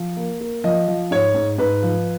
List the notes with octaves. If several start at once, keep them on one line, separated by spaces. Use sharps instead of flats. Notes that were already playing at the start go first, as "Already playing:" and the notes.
Already playing: F3
A#3
A#3
F3 D#5
F3
G#2 C#5
G#2
G#2 B4
F3